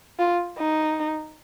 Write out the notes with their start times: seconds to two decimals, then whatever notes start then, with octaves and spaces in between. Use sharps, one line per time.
0.19 F4
0.58 D#4